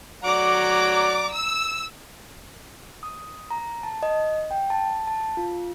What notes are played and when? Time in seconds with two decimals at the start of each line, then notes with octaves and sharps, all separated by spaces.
0.24 F#3 D5 F#5 A#5 D6
1.32 E6
3.03 D#6
3.51 A#5
3.83 A5
4.03 D#5
4.51 G5
4.70 A5
5.07 A5
5.37 F4